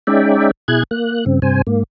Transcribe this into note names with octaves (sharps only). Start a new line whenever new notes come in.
G#3 C#4 D#4 D5 E5 G5
B2 E4 G#4 F#6 G#6
A#3 F#6
G2 C#3 C4
G2 C3 C5 G#5
G#2 A#3